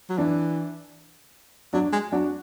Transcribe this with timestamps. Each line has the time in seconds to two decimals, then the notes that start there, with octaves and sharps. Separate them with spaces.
0.10 F#3
0.18 E3 D4
1.73 F#3 D4
1.93 G#3
2.12 F#3 D4 F#4